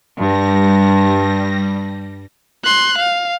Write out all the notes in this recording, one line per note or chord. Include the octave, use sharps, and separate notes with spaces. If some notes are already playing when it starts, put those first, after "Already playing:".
G2 G3 A#6
C6 F#6
F5